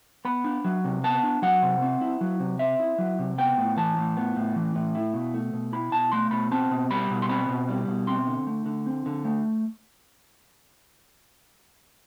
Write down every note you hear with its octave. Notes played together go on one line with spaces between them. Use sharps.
B3 B5
D4
F#3
C3
B3 A5
D4
F#3 F#5
C3
C4
E4
F#3
C3
C4 E5
E4
F#3
C3
B3 G5
A2
E3 A5
A2
B3
A2
E3
A2
E4
B2
A3
B2
E4 B5
B2 A5
A3 C6
B2 B5
C4 A5
B2
G3 B5
B2
C6
C4 B5
B2
G3
B2
C4 C6
D3
A3
D3
C4
D3
A3